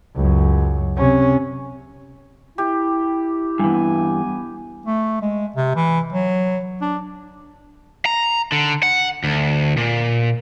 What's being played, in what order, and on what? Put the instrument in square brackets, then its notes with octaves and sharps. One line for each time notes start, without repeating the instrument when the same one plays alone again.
[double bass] C#2 F#2
C3 C#4
[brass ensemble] E4 [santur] G4
[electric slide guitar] G2 E3 [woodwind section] B3 G#5
[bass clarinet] A3
G#3
C3
E3
F#3
D4
[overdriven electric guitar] A#5
D3
F#5
D2
A#2